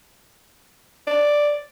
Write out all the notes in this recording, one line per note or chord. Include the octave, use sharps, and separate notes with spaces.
D5